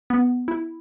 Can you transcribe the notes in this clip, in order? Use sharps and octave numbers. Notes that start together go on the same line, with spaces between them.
B3
E4